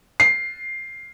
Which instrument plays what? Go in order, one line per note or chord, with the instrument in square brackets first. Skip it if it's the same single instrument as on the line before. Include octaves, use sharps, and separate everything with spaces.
[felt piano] C7